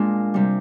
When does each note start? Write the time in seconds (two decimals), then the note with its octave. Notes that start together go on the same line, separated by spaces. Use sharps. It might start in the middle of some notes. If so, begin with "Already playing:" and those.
Already playing: A#2 G#3 D4 F4
0.34 C3 G3